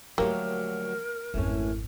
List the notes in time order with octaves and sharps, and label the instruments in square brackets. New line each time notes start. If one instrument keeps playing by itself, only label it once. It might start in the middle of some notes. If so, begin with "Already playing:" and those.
[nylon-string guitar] D2 F#3 G4 [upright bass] F3 A3 [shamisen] A#3 [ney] A#4
[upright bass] G#1 F2 [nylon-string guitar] E3 A3 C#4